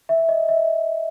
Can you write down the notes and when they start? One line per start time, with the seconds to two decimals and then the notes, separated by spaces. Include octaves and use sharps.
0.09 E5
0.29 D#5
0.49 E5